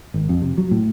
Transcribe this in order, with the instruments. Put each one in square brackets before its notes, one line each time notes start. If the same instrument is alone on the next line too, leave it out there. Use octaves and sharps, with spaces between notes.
[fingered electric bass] G#1
F2
C3
F#3
A2